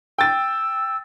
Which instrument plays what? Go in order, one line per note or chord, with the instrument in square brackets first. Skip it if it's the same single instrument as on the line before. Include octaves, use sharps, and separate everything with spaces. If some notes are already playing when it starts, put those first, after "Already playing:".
[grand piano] G5 A6 [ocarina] E6